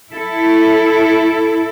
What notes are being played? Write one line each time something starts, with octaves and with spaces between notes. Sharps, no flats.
E4 A4